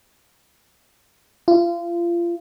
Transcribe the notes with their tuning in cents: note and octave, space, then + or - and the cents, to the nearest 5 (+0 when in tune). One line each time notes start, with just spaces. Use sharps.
F4 -30